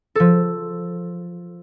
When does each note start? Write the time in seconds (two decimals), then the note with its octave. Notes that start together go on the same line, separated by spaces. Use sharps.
0.15 F3 A4